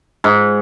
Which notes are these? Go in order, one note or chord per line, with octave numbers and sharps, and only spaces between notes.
G#2